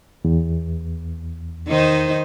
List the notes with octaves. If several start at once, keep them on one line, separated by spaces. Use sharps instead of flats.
E2
D#3 D#4 C5